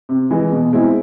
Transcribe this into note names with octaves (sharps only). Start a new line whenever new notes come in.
C3
E3 G#3
B2
G#3 C4 E4